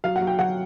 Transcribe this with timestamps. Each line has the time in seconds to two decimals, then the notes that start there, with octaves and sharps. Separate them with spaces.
0.04 F#3 F5
0.16 F#5
0.21 F#3
0.27 G5
0.39 F#3 F#5